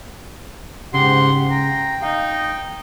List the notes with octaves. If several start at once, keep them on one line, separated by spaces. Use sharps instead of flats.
G#2 C#3 G4 F#5 C6
G5 A#5
D#4 F5